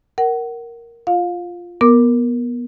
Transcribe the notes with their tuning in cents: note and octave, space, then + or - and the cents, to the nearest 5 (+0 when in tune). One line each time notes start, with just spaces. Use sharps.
A#4 +0 F#5 +25
F4 +0 F5 +20
B3 -20 A#4 +0 D6 +5